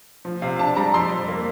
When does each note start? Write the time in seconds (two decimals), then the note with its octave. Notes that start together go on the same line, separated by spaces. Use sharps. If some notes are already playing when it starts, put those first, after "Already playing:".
0.25 F3
0.42 C3 F5
0.59 D4 A5
0.76 G3 A#5
0.94 F2 C6
1.11 F2
1.28 A#3